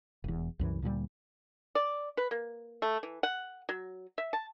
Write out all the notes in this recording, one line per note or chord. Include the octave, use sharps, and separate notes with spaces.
E1 E2
C2 F#2 E3
D2 A#2 E3 G3
D5
B4
A#3
A3
E3
F#5
F#3
E5
A5